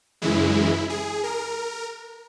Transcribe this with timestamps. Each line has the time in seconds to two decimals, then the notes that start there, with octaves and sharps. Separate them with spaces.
0.22 F#2 C#3 E3 G#3 E4
0.90 G#4
1.24 A#4